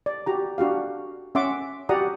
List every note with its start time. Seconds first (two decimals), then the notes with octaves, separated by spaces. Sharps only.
0.06 D5
0.26 F#4 G4 A#5
0.58 D4 F#4 G4 F5
1.35 C#4 E5 F#5 C6 D6
1.89 F#4 G4 D5 F#5 A#5 D#6